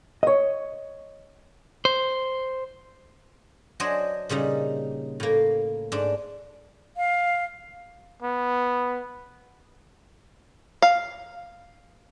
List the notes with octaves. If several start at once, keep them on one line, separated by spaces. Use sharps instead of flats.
C#5 D#5
C5
F#3 D4 C5 D#5 G#5
A#2 C#3 G3 D#4
A2 A#3
G#2 D4
F5
B3
F5